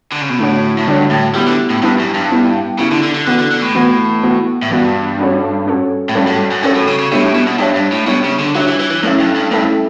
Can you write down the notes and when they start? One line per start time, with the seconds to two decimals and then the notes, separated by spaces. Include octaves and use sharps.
0.12 D3
0.21 C#3
0.29 B2
0.39 A2 D3 A3 D4 F#4 C#5
0.78 A2
0.87 G2 D3 A3 D4 F#4 C#5
1.11 A2
1.35 G3 B3 E4 G4
1.47 D3
1.70 A2
1.82 G2 B3 E4 G4
2.00 F#2
2.15 G2
2.31 B3 E4 G4
2.78 C#3 B3 E4 G4
2.91 D3
3.03 D3
3.15 D3
3.27 D3 E3 B3 F#4
3.39 D3
3.52 D3
3.62 A2
3.75 E3 B3 F#4
4.23 E3 B3 F#4
4.62 A2
4.70 G2 E3 B3 F#4
5.19 G3 C#4 F#4 A4 C#5
5.67 G3 C#4 F#4 A4 C#5
6.09 A2
6.15 G2 G3 C#4 F#4 A4 C#5
6.27 A2
6.39 G2
6.51 F#2
6.63 G2 G3 C#4 F#4 A4 C#5
6.76 A2
6.87 C#3
6.99 C#3
7.12 B2 G3 D4 G4 C#5 E5
7.23 A2
7.35 B2
7.47 B2
7.59 G2 G3 D4 G4 C#5 E5
7.75 G2
7.92 A2
8.07 B2 G3 D4 G4 C#5 E5
8.24 C#3
8.39 D3
8.55 F#3 G3 D4 G4 C#5 E5
8.68 E3
8.80 E3
8.91 E3
9.03 F#2 A3 C#4 E4 A4 E5
9.20 G2
9.35 G2
9.51 G2 A3 C#4 E4 A4 E5